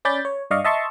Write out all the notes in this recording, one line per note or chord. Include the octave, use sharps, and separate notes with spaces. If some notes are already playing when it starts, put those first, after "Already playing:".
C#4 D5 B5 G6 A6
C#5
G2 D5 D#5 F5 C#6
D#5 E5 A5 C6 C#6